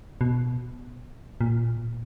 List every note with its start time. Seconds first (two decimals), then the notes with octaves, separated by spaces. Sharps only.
0.21 B2
1.41 A#2